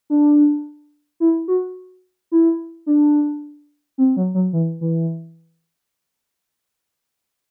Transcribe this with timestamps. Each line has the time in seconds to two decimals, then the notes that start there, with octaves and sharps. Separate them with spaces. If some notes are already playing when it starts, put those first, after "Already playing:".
0.10 D4
1.20 E4
1.48 F#4
2.32 E4
2.86 D4
3.98 C4
4.17 F#3
4.34 F#3
4.53 E3
4.81 E3